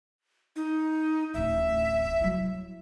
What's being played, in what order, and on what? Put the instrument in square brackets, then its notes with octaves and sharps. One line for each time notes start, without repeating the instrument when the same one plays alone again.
[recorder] D#4
[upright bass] D1 A1 [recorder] E5
[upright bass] F#3 E4